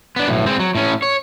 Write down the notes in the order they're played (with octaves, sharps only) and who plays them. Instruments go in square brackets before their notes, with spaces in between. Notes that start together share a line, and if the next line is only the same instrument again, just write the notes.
[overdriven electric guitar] B3 D4
B1 A2
G#3 C4
F#3
A2 C#4
C#5